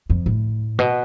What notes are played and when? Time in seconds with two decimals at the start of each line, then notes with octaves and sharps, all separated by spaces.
0.10 F2
0.26 A2
0.79 B2